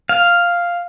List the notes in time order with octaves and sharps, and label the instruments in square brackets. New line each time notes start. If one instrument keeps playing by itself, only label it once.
[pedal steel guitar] F5